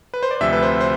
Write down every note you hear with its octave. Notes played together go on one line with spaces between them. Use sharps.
B4
C5
D5
D2 C3 F3 E5
B4
C5
C5